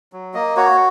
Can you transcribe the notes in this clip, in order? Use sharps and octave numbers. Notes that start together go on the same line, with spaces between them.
F#3
A#3 D#5
F#4 C#5